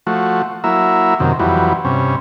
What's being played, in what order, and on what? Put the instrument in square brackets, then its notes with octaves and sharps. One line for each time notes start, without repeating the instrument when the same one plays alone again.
[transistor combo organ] F3 A3 F#4
F#3 A#3 E4 E5
F#2 C3 D#3
F2 E3 F#3 G3
G2 C3 C#4